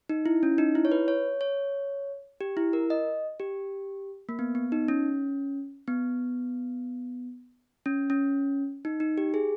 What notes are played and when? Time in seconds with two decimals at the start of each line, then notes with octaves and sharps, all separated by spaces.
0.09 D#4
0.26 E4
0.43 C#4
0.58 D#4
0.75 E4
0.85 C#5
0.92 B4
1.08 C#5
1.41 C#5
2.41 G4
2.57 E4
2.73 A#4
2.90 D#5
3.40 G4
4.29 A#3
4.39 B3
4.55 B3
4.72 D#4
4.88 C#4
5.88 B3
7.86 C#4
8.10 C#4
8.85 D#4
9.00 D#4
9.18 G4
9.34 G#4